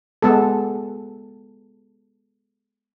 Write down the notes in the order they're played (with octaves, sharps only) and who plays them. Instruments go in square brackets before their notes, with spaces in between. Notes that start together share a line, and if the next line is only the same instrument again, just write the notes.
[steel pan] G#3 B3 A4